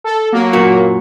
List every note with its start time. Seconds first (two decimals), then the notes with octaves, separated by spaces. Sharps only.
0.04 A4
0.32 F#3 A#3
0.53 F#2 A#2 F#4